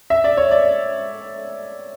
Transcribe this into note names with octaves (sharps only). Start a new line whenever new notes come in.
E5
D5
C#5
D5